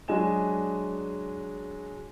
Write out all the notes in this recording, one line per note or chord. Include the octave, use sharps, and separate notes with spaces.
F#3 G#3 D4 D#5 G#5 E7